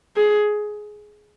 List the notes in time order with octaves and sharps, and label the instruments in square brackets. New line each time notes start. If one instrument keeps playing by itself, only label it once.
[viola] G#4